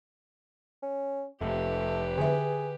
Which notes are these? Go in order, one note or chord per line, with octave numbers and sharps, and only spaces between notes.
C#4
F1 A3 G4 B4
D3 G#4 E5